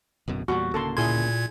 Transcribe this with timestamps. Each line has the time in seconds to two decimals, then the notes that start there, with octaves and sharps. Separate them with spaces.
0.28 D1 F#2 B2
0.48 E2 A#2 G3 F#4
0.74 D1 C#3 A#3 A4 A5 C6
0.97 A#2 E4 G#4 C6 G#6